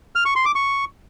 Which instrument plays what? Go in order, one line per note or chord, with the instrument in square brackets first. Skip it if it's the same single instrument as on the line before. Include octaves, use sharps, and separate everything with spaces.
[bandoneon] F6
C#6
C6
D6
C#6